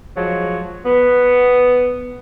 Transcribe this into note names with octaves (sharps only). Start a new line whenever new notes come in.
F3 F#3 G#3
B3